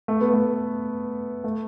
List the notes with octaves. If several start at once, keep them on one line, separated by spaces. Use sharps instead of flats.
A3
B3
A3
A3